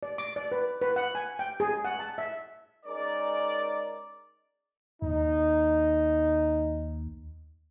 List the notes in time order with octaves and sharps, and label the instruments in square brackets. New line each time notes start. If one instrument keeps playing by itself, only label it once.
[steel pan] D5
D6
D5
B4
B4
F#5
G#5
G5
G#4
F#5
A5
E5
[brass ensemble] G#3 C#4 D#4 A#4 D5
[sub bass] D#2 [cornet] D#4